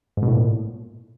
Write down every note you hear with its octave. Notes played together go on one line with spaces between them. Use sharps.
G#2
B2
A2
A#2